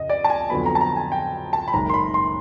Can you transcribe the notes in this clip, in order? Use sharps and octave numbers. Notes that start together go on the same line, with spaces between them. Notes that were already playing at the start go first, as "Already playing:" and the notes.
Already playing: F2 C#3 D#5
D5
A5
G#5
F2 D3 F#3 B3 B5
A#5
A5
A#5
G#5
G5
A5
B5
F#1 F#2 D#3 G#3 A#5
C6
B5
C6